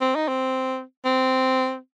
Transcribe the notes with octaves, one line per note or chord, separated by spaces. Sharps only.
C4
D#4
C4
C4